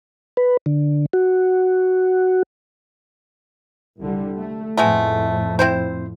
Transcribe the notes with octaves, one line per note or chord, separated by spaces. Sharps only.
B4
D3
F#4
C2 D3 G3
A3
F2 A2 G#3 A3 B3
C4 E4 C5